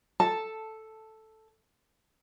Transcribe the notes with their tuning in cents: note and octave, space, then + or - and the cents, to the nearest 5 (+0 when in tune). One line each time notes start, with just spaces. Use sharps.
A4 +0 A5 +5